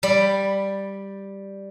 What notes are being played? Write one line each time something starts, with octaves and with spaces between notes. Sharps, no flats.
G3 D5 B5